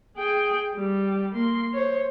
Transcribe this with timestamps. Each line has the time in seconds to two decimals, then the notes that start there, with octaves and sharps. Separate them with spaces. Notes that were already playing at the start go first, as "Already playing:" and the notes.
0.17 G#4 G5
0.76 G3
1.35 A#3 C6
1.74 C5 C#5